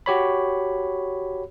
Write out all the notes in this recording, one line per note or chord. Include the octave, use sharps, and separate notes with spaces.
F#4 G4 C#5 B5